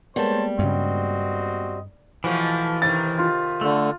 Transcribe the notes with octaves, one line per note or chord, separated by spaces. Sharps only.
G3 G#3 A#3 B3 C5 C#5 A5
G2 C#3 C4 F#4 D#5
B2 E3 F3 A3
C3 D#3 A6
F4
D3 A3